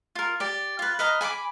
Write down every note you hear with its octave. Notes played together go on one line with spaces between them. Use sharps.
F4 A#4
G4 D5
F4 B4
B4 D#5 F5 A#5
G#5 B5 C#6 D6